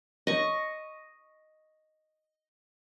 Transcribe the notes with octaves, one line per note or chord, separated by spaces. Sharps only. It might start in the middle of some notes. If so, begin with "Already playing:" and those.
D#5 C#6